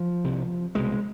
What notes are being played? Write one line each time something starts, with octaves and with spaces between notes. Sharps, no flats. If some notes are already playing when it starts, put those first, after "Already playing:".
Already playing: F3
C2 C3
C2 B2 G#3